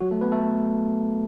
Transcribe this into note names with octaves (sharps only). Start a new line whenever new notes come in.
F#3 F#4
A3 A4
B3 B4
A3 A4